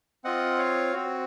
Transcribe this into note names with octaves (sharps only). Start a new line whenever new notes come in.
C4 F4 D#5 F#5
C#5 F5
C4 F#4